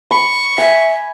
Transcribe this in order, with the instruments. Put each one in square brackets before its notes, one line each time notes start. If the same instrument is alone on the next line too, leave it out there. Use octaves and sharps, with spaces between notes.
[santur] B5 [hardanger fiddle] C#6
[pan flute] E5 [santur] G#5